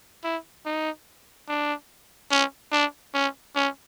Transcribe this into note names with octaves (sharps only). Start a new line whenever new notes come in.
E4
D#4
D4
C#4
D4
C#4
C#4